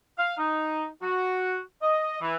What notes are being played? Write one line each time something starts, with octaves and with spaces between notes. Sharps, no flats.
F5
D#4
F#4
D#5
E3